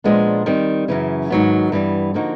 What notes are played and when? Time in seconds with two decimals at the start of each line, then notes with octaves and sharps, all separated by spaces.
0.04 A#2 F3 G#3 B3 D4
0.46 D#3 G3 C4
0.88 F#2 C#3 E3
1.30 G#2 D#3 F#3 B3
1.72 G2 E3 G3 B3
2.14 D3 F3 A#3 D#4 F#4